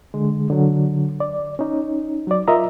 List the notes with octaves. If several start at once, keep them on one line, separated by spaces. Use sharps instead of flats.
D3 G#3
D3 F#3
D5
C#4 D#4
F#3 D5
F4 A#4 D#5 E5 A#5